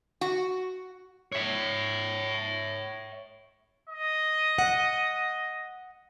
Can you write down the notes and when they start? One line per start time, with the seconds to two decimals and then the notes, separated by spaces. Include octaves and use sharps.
0.21 F#4
1.32 C#5 E5
3.89 D#5
4.58 F#5